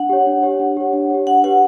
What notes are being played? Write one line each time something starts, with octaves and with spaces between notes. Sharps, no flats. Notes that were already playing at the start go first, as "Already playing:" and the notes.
Already playing: D4 F#5
G4 C#5
D4
G4 C#5
D4
G4 C#5
D4
G4 C#5
D4 F#5
G4 B4 F#5